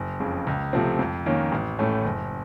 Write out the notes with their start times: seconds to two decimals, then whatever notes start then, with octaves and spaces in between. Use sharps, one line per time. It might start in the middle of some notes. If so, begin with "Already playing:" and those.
Already playing: F#1
0.20 F2 C#3
0.47 C#2
0.73 C3 F3 A3 C4
0.99 F2
1.26 D#3 A#3 C#4
1.52 A1
1.79 A2 A3 C#4
2.05 F#1